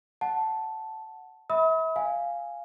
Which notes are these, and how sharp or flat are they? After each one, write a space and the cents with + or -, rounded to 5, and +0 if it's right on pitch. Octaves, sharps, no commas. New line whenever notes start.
F#5 +0 A5 -5
E5 -35 B5 +0 D#6 +45
F5 -5 G#5 +0